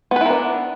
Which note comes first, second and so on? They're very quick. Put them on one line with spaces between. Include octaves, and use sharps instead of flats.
B3 B4 E4 A#4 D4